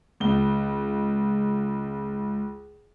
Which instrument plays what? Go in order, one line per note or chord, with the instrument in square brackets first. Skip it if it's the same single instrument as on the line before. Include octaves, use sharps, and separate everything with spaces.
[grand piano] C#2 G7